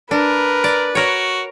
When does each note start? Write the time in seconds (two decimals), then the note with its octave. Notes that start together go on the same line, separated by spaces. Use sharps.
0.11 D4 A#4 B4
0.64 D5
0.95 F#4 A#4 C#5